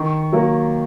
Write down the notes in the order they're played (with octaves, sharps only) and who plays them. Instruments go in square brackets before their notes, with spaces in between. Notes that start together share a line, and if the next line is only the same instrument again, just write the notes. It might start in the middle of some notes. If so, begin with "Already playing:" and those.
Already playing: [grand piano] D#3 C#6
F#3 A#3